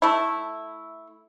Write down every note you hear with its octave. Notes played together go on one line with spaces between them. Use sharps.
A3 E4